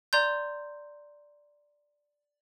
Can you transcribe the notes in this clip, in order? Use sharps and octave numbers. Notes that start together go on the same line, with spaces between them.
D5 A#5 C6 G6